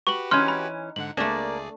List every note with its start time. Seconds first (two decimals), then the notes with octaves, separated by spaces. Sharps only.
0.07 F#4 G4 B4 C#6 F#7
0.31 E3 C#4 D#4 C6 F6 F#6
0.48 B5
0.96 G#2 D3 F#5 F#7
1.17 C#2 A3 A#3 D4 G#4 D5